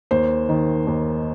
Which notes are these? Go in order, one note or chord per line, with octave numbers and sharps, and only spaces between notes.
D#2 C5
D#3
D#2